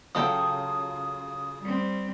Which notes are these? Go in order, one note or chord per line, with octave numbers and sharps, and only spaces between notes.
C#3 F#3 F4 A4 G5 D#6
G3 C4